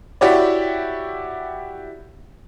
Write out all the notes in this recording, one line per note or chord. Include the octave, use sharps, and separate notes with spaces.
E4 F#4 G4 C#5 D5